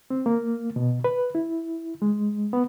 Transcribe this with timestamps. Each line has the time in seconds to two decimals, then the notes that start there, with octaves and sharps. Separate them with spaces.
0.10 C4
0.26 A#3
0.76 B2
1.04 B4
1.35 E4
2.02 G#3
2.53 B3